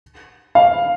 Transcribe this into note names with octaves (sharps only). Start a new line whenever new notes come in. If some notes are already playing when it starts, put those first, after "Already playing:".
F5